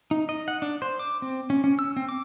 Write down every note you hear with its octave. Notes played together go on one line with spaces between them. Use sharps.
D#4
D#5
F#5
D4
C5
D6
C4
C#4
C#4
E6
C4
D6